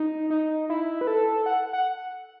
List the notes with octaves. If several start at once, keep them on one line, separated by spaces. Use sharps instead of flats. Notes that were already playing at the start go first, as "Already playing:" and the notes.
Already playing: D#4
D#4
E4
B4
A4
F#5
F#5